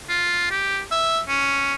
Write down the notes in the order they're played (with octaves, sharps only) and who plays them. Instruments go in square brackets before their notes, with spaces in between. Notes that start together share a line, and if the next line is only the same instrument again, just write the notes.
[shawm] F4
G4
E5
C#4